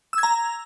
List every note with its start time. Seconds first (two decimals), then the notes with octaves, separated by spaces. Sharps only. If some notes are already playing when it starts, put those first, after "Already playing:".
0.13 E6
0.18 G#6
0.23 A#5